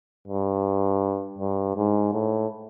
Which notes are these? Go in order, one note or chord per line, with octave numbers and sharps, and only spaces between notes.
G2
G2
G#2
A2